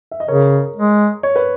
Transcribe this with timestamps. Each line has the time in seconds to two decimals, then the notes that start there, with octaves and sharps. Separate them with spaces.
0.11 E5
0.20 D#5
0.28 C#3 A#4 C#5
0.76 G#3
1.23 C#5
1.36 B4